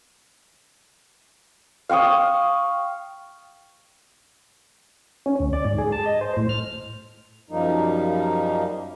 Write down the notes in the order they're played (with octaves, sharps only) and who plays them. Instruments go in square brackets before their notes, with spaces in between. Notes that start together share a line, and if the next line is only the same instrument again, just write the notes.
[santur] F5 G5 C#6 D#6
[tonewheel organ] C#4
D2
D5
G#2
G#4
A5
D#5
C5
A2
F6
[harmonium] F#2 F3 G3 A#3 D#4